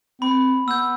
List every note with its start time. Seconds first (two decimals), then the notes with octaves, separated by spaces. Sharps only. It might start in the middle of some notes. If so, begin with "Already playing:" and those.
0.21 C4 B5
0.67 B3 E6 G6